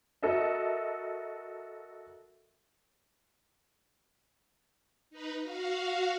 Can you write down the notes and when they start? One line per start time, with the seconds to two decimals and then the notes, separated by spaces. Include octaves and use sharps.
0.23 F#4 A4 A#4 D#5 E5
5.10 D#4 B4
5.41 F#4 F5